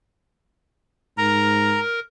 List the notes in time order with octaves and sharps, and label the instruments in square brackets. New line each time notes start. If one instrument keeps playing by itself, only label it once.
[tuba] G#2 [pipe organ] A#4 [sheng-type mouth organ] A#5